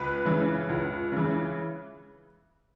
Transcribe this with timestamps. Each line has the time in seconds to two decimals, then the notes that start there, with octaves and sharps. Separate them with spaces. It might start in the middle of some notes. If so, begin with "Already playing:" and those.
Already playing: C#2 B4
0.25 C#3 E3
0.69 C#2
1.12 C#3 E3